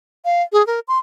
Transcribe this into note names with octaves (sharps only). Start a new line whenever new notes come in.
F5
G#4
A#4
C6